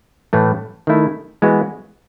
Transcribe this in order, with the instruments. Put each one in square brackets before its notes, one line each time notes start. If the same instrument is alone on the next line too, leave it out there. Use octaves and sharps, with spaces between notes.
[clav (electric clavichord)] A2 E3 A3
D#3 A3 E4
E3 G#3 B3 F#4 B4